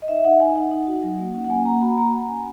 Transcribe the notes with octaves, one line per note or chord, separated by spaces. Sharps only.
D#5
D#4 E5
D#4 F#5
D#4 G#5
D#4 F#5
D#4
F#4
F#3
A#3
C#4 F#5
F#5
A#3 G#5
A#3 A#5
F#4 B5
A#3 A#5
A#3 F#5
C#4 G#5